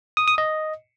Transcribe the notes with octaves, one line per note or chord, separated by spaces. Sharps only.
D#6
D#6
D#5